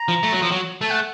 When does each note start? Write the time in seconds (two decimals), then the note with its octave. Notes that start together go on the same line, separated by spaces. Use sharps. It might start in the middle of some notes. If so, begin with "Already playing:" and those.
Already playing: A#5
0.08 F3
0.23 A3
0.32 F#3
0.42 F3
0.51 F#3
0.81 A3 A5
0.90 F#5